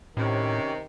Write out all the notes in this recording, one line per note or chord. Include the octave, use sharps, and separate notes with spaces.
A2 C3 D#3 C#4